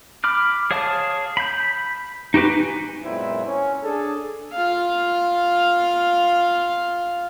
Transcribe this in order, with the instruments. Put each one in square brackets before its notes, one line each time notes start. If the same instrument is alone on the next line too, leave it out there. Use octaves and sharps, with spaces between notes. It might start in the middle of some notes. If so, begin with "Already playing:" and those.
[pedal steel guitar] B5 D6 F6
G#4 C#5 F5 A5 D#6
B5 G6
D#4 F#4 G4 B4
G#5
[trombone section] F#2 A#2 G#3 B3 C4 E4
C#4
D4 G#4 A4
[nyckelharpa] F4 F5